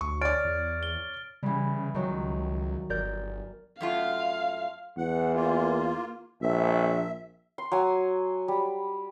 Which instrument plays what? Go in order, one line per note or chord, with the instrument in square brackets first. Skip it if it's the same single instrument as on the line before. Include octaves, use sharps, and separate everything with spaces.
[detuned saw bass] D2 [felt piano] C#6
[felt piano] C#5 D5 [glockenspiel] F6 A6 D7
[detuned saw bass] E2
[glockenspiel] G7
[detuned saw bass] C#3 [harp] E3 G3
[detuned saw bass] C#2 [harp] D#3 F#3
[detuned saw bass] G1 [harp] A#4 D5 G6
[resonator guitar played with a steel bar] F#2 A3 F4 [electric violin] F5
[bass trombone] E2 [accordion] F#5
[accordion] A#3 F4
[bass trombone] A#1 [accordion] E5
[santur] C6
F#3 G#5
G3